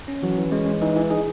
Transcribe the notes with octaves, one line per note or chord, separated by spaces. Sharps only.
C#4
E3 F#3
E3
G#3 C#4
G#3
E3 D#4
E3
D#4 G#4